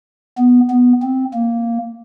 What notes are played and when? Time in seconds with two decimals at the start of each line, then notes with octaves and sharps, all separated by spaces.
0.38 B3
0.71 B3
1.02 C4
1.33 A#3